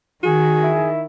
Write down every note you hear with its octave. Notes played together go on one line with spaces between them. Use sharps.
D#3 F#4 G#4
E4